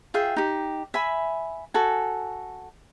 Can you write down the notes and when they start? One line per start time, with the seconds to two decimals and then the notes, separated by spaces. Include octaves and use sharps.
0.14 F4 G#4 E5 G5
0.36 D#4 G4
0.94 E5 G#5 B5
1.74 F#4 A4 G#5